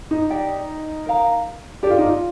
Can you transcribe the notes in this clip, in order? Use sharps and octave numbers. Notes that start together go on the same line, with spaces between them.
D#4
G4 D5 G5
A#4 F5 A#5
D4 G4 A4 D5
F4
D#4
F4